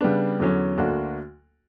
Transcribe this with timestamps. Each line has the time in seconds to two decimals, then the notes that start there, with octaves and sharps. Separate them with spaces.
0.01 C#3 G3 B3 D4
0.40 E2 D3 F#3 C#4
0.78 D2 D3 A#3 D4 F#4